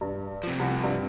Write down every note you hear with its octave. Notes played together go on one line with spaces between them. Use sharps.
G2
C3 F3
C2
G2